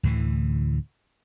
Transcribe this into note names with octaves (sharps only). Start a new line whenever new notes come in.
D2 A2 D3 E3